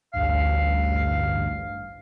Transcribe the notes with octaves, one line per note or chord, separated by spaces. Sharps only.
A1 D2 G2 F5